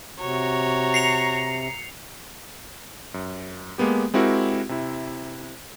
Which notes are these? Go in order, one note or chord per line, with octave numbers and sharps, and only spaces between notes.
C3 F#4 C#5 A#5
C7 C#7 F7
F#2
G#3 A#3 B3 G4
G#3 C4 E4 F#4 G4 A#4
C3 E4